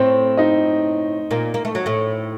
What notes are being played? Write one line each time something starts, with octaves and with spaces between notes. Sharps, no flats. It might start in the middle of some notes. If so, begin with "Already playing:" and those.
Already playing: A2 A3 C4 C5
D#4 D#5
A#2 A#3
A#3
A3
F#3
A2 A3